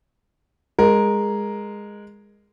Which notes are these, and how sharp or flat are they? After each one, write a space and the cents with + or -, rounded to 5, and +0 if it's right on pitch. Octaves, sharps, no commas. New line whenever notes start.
G#3 -10 A#4 +0